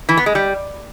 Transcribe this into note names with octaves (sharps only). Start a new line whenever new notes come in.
E3
B3
G#3
G3